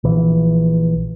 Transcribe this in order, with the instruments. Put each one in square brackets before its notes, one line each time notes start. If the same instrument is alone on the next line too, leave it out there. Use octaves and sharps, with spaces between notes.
[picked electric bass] A#1 E3